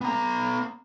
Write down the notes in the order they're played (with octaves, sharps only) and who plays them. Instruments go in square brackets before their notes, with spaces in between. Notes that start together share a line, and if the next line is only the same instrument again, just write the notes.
[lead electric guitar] B3 A#5